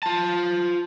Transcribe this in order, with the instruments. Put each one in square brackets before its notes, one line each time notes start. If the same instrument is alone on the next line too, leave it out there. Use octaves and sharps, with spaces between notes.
[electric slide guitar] F4 A5